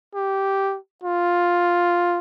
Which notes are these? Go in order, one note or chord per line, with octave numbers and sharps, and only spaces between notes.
G4
F4